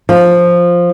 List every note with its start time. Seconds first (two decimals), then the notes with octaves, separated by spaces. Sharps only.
0.09 F3